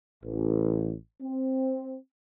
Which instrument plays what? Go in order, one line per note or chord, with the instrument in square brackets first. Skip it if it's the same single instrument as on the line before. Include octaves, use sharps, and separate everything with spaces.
[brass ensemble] A1
C4